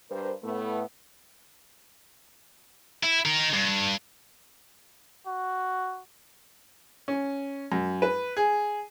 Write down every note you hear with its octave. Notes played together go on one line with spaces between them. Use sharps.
G2 A#4 C5
A2 A3 B3
E4
D#4 A#4
G2
F#4
C#4
F#2
B4
G#4